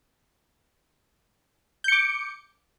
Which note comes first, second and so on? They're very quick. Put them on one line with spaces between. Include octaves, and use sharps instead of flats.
G6 C#7 D6